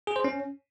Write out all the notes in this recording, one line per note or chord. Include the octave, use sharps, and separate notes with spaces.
G#4
C5
C#4